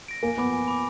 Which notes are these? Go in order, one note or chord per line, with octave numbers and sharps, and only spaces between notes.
A#6 D7
A#3 G#5
B3 B5 D6
G#5
B5 D6